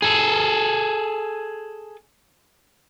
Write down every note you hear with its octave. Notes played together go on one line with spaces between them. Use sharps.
G#4 A4